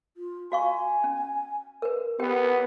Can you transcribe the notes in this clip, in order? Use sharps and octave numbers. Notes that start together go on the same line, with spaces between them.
F4
F#4 F5 G#5 C#6
C#4
A#4 B4
B3 G4 A#4 F#5 G5